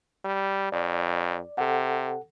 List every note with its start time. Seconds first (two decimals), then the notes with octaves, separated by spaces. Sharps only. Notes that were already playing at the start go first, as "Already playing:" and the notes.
0.25 G3
0.72 F2 D5
1.58 C3 A4 F#5